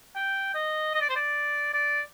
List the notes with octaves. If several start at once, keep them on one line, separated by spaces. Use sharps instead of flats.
G5
D#5
D#5
D5
C5
D5
D5